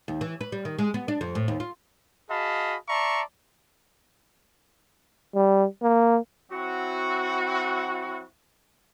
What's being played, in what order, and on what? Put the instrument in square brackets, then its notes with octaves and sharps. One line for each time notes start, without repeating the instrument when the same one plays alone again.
[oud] D#2
E3
B4
G3
D#3
G#3
B3
D4
F2
A2
D#2
F4
[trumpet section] F#4 G#4 D#5 F5 A5 B5
D5 E5 A5 A#5 C6 C#6
[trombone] G3
A#3
[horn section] F#3 C4 E4 F#4